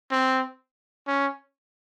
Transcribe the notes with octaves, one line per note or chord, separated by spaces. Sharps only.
C4
C#4